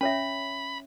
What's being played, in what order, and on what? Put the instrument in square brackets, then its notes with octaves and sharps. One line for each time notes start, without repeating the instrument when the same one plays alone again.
[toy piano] C#4 C#5 E5 [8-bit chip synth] B5